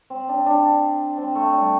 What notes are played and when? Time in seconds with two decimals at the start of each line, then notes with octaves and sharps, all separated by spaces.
0.10 C4
0.29 D4
0.46 D4
1.18 C4
1.35 A3
1.53 G3